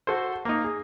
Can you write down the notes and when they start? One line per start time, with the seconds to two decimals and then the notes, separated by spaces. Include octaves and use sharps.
0.07 F#4 A4 C5
0.45 A#3 D#4
0.64 G#4